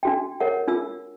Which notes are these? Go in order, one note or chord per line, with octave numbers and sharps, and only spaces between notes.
D4 F#4 G5
A#4 C#5 F#5
D4 F4 E6